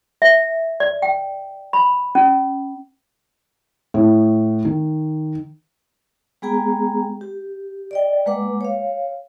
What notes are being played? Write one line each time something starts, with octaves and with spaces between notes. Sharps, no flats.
E5
D5
G5
B5
C#4
A2
D#3
G#3 B3 G#4 G5 G#5 A#5
G4
D5 D#5 G5
G#3 A#3 B4 F#5 D6
C#5 F5